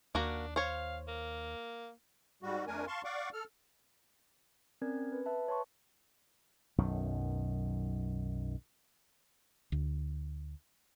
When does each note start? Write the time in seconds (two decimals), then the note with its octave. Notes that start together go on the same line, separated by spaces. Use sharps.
0.15 D#2 A#3 D4 F#4
0.56 C5 C#5 F5
1.08 A#3
2.43 G#2 G3 F#4
2.67 F2 A3 D4 A#4 G#5
2.87 F5 A5 C6 C#6
3.05 D5 F5 F#5 C#6 D6
3.33 A4 F6
4.82 C4 C#4 A#4 D5 G#6
5.12 B4
5.26 B4 E5 A5
5.48 C#5 A5 C6 C#6
6.78 B1 F#2 D#3
9.72 D2